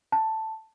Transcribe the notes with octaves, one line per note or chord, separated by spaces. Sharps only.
A5